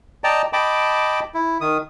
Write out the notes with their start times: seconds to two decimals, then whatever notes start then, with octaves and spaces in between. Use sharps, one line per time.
0.24 D5 D#5 G5 A5 A#5
0.53 D#5 G5 A5 B5 D6
1.34 E4
1.61 D#3 D#6